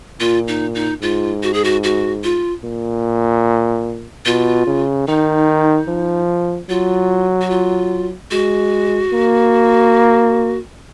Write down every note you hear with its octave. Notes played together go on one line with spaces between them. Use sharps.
A#2 F4
D#4
D#4
G#2 F4
F#4
G#4
F#4
F#4
F4
A#2
B2 F4
C#3
D#3 D#4
F3
F#3 F4
F#4
F4
G#3 F#4
A#3